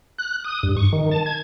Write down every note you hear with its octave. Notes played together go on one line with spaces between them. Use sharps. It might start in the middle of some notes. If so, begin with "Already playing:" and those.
F#6
D#6
G2
C#6
D#3
A5
G#6